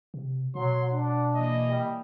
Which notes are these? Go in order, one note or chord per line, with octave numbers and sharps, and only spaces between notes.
C3
B2 F#3 C6
D4 F#5
E3 A#3 D#5
G3